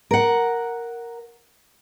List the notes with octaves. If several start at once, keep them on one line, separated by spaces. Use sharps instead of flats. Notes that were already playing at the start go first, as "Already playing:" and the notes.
A#4 F#5